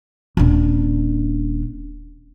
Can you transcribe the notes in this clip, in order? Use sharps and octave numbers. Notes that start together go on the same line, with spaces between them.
D#1 D4